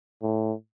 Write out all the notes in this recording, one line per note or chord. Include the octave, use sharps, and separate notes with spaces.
A2